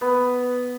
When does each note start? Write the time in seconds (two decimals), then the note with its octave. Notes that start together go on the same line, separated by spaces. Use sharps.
0.01 B3